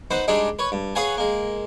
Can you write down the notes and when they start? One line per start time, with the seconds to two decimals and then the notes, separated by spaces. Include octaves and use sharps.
0.11 D#4 B4 C5 F#5
0.28 G3 G#3 D4 D#4 G#4
0.59 B4 C#5
0.72 G2
0.95 G#4 B4 C#5 F5 F#5 G#5
1.17 G#3 A#3